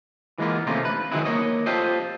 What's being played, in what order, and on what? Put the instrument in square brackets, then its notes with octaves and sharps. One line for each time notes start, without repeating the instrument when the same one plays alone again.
[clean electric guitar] E3 G#3 A#3 B3 F4
C3 D#3 A3 A#3 C#4 F4
B4
D#3 E3 F#3 G#3 B3 E4
A#3 C#5 D#5
F4 G4 A4 C5 D#5